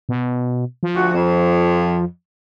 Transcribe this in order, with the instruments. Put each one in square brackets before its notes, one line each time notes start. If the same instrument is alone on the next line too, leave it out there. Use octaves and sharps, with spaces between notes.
[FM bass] B2
F3
[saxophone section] D2 F#4
F2